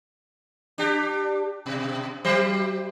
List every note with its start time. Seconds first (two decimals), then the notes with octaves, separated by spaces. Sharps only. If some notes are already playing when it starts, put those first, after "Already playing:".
0.78 D4 G4
1.66 B2
2.25 F#3 G4 C5